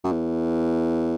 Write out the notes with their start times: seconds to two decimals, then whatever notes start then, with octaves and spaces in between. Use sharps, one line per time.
0.04 F#2
0.12 E2